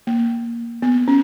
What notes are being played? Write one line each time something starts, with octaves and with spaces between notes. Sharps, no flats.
A#3
B3
C#4